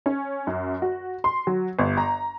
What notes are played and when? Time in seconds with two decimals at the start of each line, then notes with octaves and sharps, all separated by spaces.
0.06 C#4
0.47 F#2
0.82 F#4
1.24 C6
1.47 F#3
1.79 G1
1.97 A#5